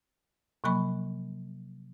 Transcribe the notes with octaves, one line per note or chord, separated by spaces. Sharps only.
C3 F3 F#3 A#3 B5 C#6